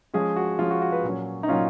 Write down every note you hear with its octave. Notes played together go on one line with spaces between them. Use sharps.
F3 G#3 C#4 G#4
F#4
F3 G#3 C#4 F4
F#4
F#4
B4
A#2 F#3 C#4
D#4
A#2 F#3 C#4 F4